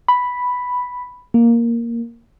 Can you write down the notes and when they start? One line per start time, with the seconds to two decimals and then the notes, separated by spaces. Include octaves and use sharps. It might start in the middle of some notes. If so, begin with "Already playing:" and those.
0.08 B5
1.34 A#3